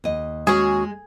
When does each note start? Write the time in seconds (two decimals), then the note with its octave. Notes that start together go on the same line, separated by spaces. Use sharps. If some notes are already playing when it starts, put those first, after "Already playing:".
0.04 D#2 D#5
0.47 G#3 C#4 F#4 G#4